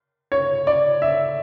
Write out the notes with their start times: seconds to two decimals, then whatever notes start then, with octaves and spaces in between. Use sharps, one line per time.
0.32 C#5
0.67 D5
1.02 E5